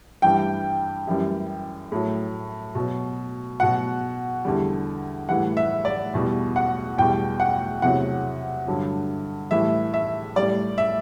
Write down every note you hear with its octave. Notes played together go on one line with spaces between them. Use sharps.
G2 E3 G3 G5
F#2 E3 G3
A2 F#3
B2 F#3
B2 F#3 F#5
E2 D3 G3
A2 E3 G3 F#5
E5
D5
E2 B2 G3
F#5
E2 B2 G3 G5
F#5
E2 C3 F#3 F#5
G2 D3 F#3
A2 E3 G3 E5
E5
A2 G3 D5
E5